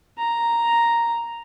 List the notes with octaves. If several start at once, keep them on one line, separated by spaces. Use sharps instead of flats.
A#5